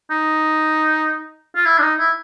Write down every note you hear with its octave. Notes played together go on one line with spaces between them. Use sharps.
D#4
F4
E4
D4
D#4
E4